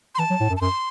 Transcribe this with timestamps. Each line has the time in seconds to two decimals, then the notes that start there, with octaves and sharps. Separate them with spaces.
0.15 C6
0.19 E3 A5
0.30 F#3
0.40 A2
0.50 F#2
0.57 A5
0.61 F#2 C6